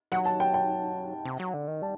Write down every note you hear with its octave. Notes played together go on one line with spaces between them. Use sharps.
F#3 F#5
A5
G5
G5
C3
F#3
D3
D#3
G3 A5